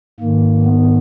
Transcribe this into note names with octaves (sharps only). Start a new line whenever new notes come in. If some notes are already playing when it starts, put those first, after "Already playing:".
G#2 D#3 A#3
B3